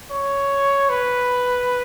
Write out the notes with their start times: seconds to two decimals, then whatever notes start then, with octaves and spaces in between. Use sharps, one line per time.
0.11 C#5
0.89 B4